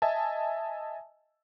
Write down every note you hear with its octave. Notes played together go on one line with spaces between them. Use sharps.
D#5 E5 G#5 A5